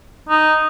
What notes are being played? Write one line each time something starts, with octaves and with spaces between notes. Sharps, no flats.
D#4